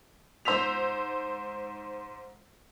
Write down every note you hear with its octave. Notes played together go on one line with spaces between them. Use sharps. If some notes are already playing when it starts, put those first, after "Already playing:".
G#2 C5 E6 B6 F7